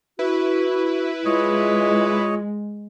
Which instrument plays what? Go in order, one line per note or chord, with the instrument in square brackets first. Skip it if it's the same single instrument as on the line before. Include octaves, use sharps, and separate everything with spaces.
[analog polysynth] E4 B4 [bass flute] F#4
[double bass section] G#3 [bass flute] F4 [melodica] C#5 D#5